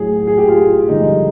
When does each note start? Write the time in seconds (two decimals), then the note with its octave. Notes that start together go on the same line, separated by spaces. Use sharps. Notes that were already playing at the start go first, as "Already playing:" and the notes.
Already playing: A2 F#3 G#4
0.27 G#4
0.38 G4
0.48 F4
0.89 G2 D3 F3 G#3 D#4